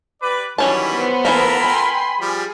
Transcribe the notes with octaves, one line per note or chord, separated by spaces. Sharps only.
G4 B4 D5 D6
D#3 E3 F#3 G3 C#4 A5 B5
B3 C5
E3 G#3 A#3 F4 A4 A#4
B3 G5 G#5 C6
F3 G3 G#4